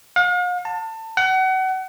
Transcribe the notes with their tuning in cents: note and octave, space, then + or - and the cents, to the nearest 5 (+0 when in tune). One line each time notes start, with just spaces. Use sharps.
F5 +45
A5 +25
F#5 +30